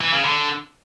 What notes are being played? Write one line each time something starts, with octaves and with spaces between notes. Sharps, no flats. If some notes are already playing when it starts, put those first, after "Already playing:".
E3
C#3
D3